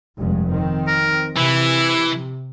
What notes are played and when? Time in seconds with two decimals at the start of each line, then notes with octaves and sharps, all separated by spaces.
0.18 F1 G2 G#3
0.50 D#3 C4
0.88 A#4
1.37 C3 E3 E4